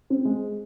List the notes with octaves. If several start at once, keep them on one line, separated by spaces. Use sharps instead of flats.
C4
G#3